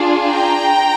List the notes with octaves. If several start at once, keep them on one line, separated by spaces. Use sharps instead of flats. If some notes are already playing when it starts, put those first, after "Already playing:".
Already playing: D4 F4 G#4
G5 A#5